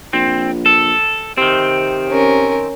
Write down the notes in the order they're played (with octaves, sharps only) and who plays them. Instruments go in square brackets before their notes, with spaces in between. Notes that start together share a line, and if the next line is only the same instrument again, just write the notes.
[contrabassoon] A#1 [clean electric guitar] C4
[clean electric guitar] A4
[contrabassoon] C3 [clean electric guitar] D#3 C4
[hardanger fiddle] C#4 A#4